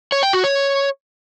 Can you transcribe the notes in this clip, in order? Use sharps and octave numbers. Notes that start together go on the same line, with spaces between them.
C#5
G5
F#4
C#5